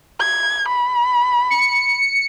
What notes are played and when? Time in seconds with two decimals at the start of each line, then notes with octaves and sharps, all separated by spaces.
0.20 G#6
0.69 B5
1.50 C#7